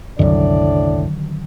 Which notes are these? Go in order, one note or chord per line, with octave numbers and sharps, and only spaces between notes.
C2 F#2 A2 D3 D#3 F#3 D4 D5